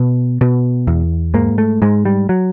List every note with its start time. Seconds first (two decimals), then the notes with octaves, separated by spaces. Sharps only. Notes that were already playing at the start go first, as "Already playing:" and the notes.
Already playing: B2
0.41 B2
0.87 E2
1.34 G#2 A#3
1.58 A3
1.82 G#2 G#3
2.05 G3
2.29 F#3